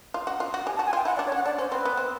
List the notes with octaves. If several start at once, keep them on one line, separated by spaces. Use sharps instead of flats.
F4
F#4
F4
F#4
G4 G#5
A5
F#4
G#5
F4 G5
E4 F#5
D5
D4
C#5
C#4 F#5
D4 D5
C#4 C5
C4 B4
B3
C4